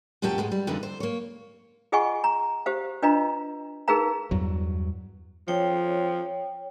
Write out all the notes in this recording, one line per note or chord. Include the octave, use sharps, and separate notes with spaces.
E2 A#2 C#4 G4 G5 A5
A2 G#3 B3
G3
F2 A#2 D3 E3 D#4
C5
A#3 C#5
F4 G#4 D#5 F#5 G#5 C#6
A#5
G4 C5 F5
D4 F4 B4 D#5 F5 A#5
D#4 G#4 A#4 B4 F5 A#5
E2 G2 F#3
F3 C#5 G5